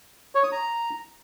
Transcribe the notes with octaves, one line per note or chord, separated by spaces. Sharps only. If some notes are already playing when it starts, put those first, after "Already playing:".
C#5
D#6
A#5